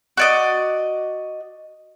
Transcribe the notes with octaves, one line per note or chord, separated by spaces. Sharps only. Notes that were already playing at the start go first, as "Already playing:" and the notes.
F#4 D5 D#5